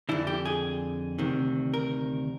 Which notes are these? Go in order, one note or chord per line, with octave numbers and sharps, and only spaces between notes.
F2 D3 E4
G4
G#4
D2 C3 D#3
A#4